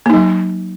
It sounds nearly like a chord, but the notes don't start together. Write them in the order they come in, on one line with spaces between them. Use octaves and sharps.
A#3 D#4 F#3